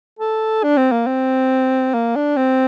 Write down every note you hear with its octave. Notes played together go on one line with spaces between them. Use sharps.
A4
D4
C4
A#3
C4
A#3
D4
C4